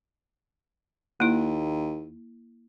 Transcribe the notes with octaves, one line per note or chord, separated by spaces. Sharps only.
D#2 A#3 E4